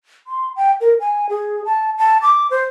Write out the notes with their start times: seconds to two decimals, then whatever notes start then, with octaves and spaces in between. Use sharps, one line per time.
0.27 C6
0.56 G5
0.81 A#4
1.00 G#5
1.29 G#4
1.65 A5
1.98 A5
2.22 D6
2.51 C5